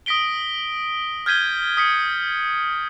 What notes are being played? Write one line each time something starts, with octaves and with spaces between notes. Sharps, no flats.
D#6 A#6 B6 D7 G7
F6 G6 G#6 B6 D#7 G7
D#6 B6 C#7